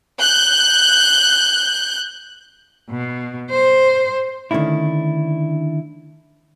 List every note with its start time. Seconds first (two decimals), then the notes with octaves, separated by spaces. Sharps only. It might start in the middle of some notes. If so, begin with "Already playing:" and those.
0.20 F#6 G6
2.90 B2
3.51 C5
4.51 D3 D#3 A3 C#4 D4 E4